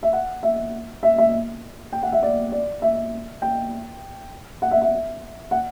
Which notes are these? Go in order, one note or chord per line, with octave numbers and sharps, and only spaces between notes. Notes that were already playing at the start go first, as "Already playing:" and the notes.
E5
F#5
E5
E5
E5
G5
F#5
E5
D5
D5
E5
G5
F#5
E5
E5
F#5